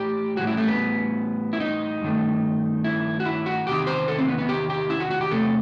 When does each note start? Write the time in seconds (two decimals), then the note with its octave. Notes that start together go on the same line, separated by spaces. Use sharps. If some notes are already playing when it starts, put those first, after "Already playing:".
Already playing: A2 E3 G4
0.37 A2 E3 G3 F#4
0.47 E4
0.57 A3
0.68 B3
1.53 E4
1.60 D#4
2.02 G2 D#3 A3
2.84 E4
3.20 F#4
3.25 E4
3.46 F#4
3.67 E2 C3 D#3 G4
3.87 C5
4.08 A4
4.18 C4
4.28 B3
4.38 B3
4.49 G4
4.70 G4
4.90 E4
5.00 F#4
5.11 F#4
5.21 G4
5.31 E2 C3 F#3 A3 A4